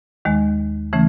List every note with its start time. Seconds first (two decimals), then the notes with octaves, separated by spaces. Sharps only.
0.25 D#2 D#3 G#3
0.93 C#3 E3 A3 C#4